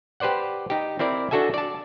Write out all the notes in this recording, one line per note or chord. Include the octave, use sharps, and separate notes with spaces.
G4 B4 C5 D5 F#5
D#4 G4
C4 E4 A#4 D5
D4 F#4 A4 E5 G#5
D5 A5